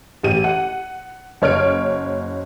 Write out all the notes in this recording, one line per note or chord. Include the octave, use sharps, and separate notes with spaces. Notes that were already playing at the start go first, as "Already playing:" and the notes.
A1 G4 D#7
F#5
F#1 C#5 F6 D7